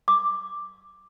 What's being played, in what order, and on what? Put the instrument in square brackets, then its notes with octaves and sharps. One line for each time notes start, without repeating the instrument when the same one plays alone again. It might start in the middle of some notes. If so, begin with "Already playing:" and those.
[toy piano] D6